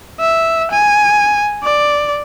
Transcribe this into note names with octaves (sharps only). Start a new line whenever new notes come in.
E5
G#5
D5